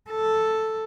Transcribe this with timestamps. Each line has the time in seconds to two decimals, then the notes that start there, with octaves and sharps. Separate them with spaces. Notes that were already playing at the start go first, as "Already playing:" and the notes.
0.10 A4